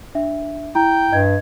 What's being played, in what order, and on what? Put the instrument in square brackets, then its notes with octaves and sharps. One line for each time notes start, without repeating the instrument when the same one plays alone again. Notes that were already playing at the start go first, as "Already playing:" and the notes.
[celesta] D4 E5
[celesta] E4 A#5 [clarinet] G5
[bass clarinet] G2 [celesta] D#5 G#6